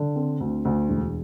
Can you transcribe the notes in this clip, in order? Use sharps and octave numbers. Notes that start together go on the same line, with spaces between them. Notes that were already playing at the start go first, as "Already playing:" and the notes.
Already playing: D3
C4
D2
D2
E1